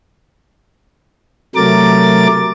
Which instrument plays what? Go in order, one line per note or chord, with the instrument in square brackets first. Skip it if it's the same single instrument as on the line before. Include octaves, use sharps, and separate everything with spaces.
[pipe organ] C3 F#3 A3 A#4 D6 A6